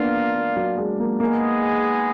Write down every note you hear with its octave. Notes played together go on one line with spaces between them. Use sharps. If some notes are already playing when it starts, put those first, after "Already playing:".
Already playing: A#3 B3 D4 F4 A#4 F5
A#3
F#3
G#3
A#3
G#3 A#3 B3 D#4 G#4